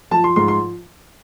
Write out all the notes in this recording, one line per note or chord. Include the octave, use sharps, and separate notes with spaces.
F3 A5
C6
G#2 C6
C6